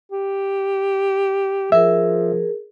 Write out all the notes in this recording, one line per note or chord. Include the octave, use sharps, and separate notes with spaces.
G4
F3 G#4 A#4 E5